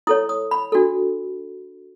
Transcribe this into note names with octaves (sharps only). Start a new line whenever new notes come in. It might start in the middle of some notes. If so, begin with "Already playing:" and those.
E4 A4 C#5 D#6
D#6
B5
D4 F#4 A4